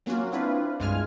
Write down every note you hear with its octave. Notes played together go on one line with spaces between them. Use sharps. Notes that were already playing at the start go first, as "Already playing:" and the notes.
F#3 A#3 C#4 F4 F#4
C4 D4 E4 F4 B4
C2 G2 G#3 F4 G#5 F6